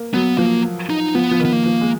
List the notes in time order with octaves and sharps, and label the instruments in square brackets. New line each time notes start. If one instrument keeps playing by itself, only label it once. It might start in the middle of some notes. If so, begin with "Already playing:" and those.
Already playing: [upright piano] A#3
[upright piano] F#3 [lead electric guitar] B3
[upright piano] F3 [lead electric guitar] A#3
[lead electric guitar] D#4
[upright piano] F3 [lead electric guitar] B3
[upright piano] F3
D#3
[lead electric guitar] B3
A#3
[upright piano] F3
G#3